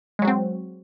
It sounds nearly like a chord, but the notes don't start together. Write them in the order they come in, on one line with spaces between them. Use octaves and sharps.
G#3 F#3 F#4 C4